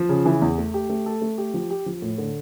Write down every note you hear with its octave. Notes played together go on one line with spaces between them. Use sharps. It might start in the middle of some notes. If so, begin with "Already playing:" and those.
Already playing: F3
C#3
E3
E2
A3
G4
A3
A4
A3
G4
F3
G4
F3
A2
D3